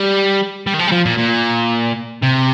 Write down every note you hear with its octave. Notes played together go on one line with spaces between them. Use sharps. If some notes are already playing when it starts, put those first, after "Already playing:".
Already playing: G3
G3
D#3
F3
G3
F3
A#2
A#2
C3